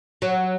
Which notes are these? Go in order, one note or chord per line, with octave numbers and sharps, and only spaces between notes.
F#3